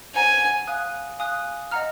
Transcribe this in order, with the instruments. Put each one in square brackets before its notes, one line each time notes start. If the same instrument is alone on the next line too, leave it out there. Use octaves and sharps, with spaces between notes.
[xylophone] C5 F#5 A#5 [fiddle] G#5
[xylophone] F5 G#5 D#6 F#6
F5 G#5 D#6 F#6
D#5 F#5 A#5 F6